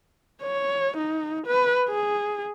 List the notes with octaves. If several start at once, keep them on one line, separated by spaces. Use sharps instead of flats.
C#5
D#4
B4
G#4